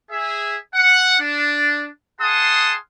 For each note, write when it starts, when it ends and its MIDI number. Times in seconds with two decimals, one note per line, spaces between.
0.10 0.55 68
0.10 0.55 76
0.74 1.18 78
1.20 1.86 62
2.20 2.75 68
2.20 2.75 77
2.20 2.75 78
2.20 2.75 81
2.20 2.75 84
2.20 2.75 87